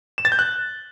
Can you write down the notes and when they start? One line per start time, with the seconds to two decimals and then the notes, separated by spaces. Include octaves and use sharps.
0.18 E7
0.25 A6
0.32 G6
0.39 F#6